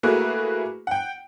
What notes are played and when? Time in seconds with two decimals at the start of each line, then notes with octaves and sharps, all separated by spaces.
0.03 A3 A#3 E4 F#4 G#4 B4
0.87 F#5 G5